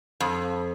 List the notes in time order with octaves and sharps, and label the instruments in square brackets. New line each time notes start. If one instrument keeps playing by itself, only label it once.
[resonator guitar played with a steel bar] F2